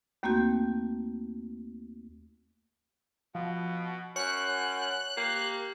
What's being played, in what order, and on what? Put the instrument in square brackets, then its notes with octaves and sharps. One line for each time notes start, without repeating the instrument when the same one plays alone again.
[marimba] D#2 A3 A#3 C4 F#4 G6
[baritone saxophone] B2 [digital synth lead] F3
[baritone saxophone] F#2 [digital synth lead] C#5 [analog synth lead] F#6
[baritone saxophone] A#3 [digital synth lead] G4